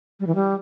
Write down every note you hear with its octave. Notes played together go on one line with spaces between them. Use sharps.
G3
E3
G3